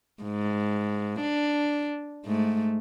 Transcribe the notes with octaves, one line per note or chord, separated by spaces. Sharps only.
G#2
D4
G#2 A3